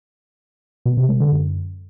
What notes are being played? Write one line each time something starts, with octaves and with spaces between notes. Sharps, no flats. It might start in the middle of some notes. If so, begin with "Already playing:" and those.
B2
C3
G#3
D3
F#2